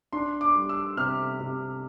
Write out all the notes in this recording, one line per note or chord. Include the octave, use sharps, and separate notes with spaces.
D4 C6
D6
G3
E6
C3 F6
C3